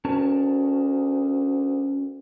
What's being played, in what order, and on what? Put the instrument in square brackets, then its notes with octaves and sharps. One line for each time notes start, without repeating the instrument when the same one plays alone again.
[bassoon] D2 [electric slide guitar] C#4 A#4 A5